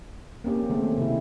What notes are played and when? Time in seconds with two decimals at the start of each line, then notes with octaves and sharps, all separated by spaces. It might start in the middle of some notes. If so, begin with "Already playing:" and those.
0.44 A#3 C4 C#4 G4
0.69 D#3 G#3 A3 C4
0.98 C3 D#3 E4